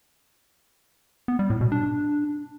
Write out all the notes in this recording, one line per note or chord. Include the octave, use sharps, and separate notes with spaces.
B3
G3
A2
B2
D4